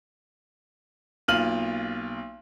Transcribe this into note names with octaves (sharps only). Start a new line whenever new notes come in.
B1 A#3 F4 F6 D#7 F#7